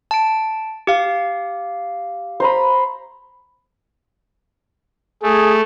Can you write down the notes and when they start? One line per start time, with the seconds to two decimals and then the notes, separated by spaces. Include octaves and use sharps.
0.11 A5 D7
0.87 G4 F5
2.40 C5 A#5 B5
5.23 A3 G#4